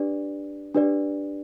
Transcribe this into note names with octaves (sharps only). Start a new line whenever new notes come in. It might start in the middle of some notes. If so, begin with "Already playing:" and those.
Already playing: D4 G4 B4 D5
D4 G4 B4 D5